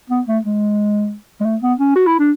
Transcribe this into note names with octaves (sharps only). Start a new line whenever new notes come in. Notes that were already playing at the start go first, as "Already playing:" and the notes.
B3
A3
G#3
G#3
A3
B3
C#4
F#4
E4
D4